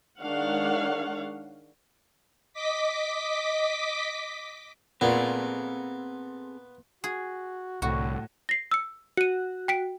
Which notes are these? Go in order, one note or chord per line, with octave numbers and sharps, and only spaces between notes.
D#3 G#3 D4 C#5 F5 F#5
D#5 D6 B6
A#2 B3 C4 G#4 A4
F#4 G#4
C2 A2 D3 F#4
A#6 C7
E6 C#7
F#4 C#7 D#7
G5 B6 D7